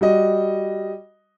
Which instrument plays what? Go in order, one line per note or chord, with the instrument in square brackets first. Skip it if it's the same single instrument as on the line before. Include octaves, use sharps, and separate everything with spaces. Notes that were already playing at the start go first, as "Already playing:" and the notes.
[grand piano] G3 F#4 D#5